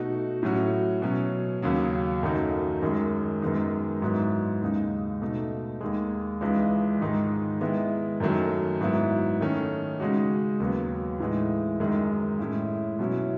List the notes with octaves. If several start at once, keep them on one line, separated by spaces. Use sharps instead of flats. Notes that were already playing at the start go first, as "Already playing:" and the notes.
Already playing: B2 A3 D#4 F#4
A2 F#3 C#4 F#4
B2 F#3 C#4
D#2 C#3 F#3
F#2 D#3 A3 D#4 F#4
F#2 D#3 G#3
F#2 D#3 G#3 B3 D#4
G#2 F#3 B3 E4
D#2 C#3 G#3 D#4
B2 A3 D#4
D#2 D#3 G#3
C#2 C#3 E3 G#3 D#4
G#2 D#3 G#3 D#4
D#3 G#3 B3 E4
F#2 D#3 F#3 A3
G#2 F#3 B3 E4
D#3 A3 C#4
C#3 G#3 D#4 F#4
D#2 C#3 F#3 B3
A2 E3 G#3 D#4
F#2 D#3 G#3 D#4
A2 G#3 C#4 E4
B2 F#3 C#4 E4